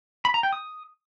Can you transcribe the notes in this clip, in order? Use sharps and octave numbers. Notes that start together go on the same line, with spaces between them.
B5
A#5
G5
D#6